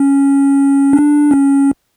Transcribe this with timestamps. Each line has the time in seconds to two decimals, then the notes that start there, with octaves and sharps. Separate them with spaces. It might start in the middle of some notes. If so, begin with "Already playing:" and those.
Already playing: C#4
0.93 D4
1.31 C#4